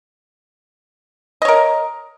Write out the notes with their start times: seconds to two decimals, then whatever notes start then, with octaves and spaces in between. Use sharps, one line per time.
1.42 D#5
1.45 C#5
1.48 A#4